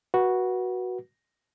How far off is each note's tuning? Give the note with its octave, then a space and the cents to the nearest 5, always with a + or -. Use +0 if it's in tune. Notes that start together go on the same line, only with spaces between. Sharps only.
F#4 +0 B4 -25